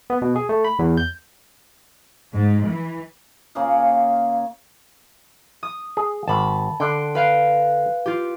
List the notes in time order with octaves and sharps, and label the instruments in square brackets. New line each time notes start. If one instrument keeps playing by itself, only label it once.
[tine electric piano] B3
B2
G#4
A3
B5
E2
G6
[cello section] G#2
E3
[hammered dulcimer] C#3 A#3 G#4 A#4
[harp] D#6
[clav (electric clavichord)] G#4
[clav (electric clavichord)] G#1 [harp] A5 B5
[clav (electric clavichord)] D3 [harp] G5 C6 F#6
[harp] B4 F5 G5
F4 G4